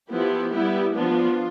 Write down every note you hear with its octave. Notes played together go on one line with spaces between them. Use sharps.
F3 B3 E4 G4
G3 B3 E4
F3 B3 D4 F4